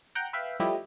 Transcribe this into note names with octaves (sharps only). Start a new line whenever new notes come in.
F#5 G5 A#5
B4 E5 F5 G5 B5
F3 G3 A3 E4 G4 D#5